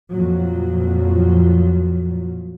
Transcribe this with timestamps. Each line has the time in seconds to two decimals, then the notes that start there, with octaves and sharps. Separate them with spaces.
0.11 F2 A#2 F3 F#3